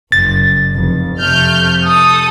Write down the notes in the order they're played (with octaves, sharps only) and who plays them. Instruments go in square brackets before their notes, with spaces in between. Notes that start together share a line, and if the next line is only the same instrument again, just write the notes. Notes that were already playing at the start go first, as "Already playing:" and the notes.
[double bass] F#1 F#2 [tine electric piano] A6
[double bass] F1 F2
[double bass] F2 C3 [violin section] A3 F6 G6
[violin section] A4 D#6